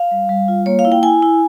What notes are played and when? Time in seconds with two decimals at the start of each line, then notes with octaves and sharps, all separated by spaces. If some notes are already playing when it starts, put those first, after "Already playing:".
Already playing: F5
0.11 G3
0.29 G3
0.48 F4
0.66 A#3 C#5
0.79 F5
0.85 E4
0.92 G5
1.03 E4 G#5
1.23 E4